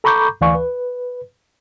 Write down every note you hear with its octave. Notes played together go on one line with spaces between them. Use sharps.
A4 A#5 B5 C#6 D6 G6
D2 E3 D5 F5 G#5 C#6
B4